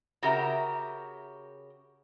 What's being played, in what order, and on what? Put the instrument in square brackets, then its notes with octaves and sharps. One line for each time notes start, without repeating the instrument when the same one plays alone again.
[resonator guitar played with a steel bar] C#3 F#4 G4 A#4 E5 A#5